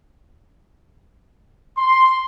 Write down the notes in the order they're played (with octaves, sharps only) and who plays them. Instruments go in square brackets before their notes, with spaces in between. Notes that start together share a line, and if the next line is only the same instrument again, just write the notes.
[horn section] C6